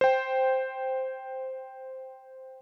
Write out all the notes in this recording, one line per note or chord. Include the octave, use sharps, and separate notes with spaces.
C5 G5